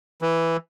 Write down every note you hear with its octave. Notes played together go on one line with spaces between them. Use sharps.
E3